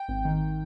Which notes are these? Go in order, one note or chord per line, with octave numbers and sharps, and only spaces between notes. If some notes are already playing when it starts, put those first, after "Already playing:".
Already playing: G5
G#1
D#3